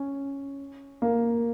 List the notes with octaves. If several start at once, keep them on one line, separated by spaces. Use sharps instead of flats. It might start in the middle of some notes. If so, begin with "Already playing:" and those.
Already playing: C#4
A#3